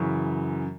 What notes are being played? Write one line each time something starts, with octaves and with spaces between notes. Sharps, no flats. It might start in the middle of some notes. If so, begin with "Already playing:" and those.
Already playing: F#2 C#3 E3